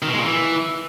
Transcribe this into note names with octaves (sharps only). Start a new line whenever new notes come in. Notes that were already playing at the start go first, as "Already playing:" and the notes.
D#3
B2
G#3
A#2
E3